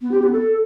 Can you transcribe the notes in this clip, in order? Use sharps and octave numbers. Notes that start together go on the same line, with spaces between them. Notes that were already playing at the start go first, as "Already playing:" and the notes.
B3
G4
B3
A4